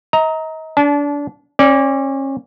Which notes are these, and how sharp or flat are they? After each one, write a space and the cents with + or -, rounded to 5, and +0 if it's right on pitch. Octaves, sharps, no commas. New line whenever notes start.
D#5 +35 A#5 +0
D4 -25 A5 -35
C#4 -35 D5 -15